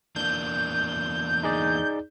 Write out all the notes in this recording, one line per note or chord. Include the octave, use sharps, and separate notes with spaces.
E2 A#3 D4 G6
D#4 G#4 D5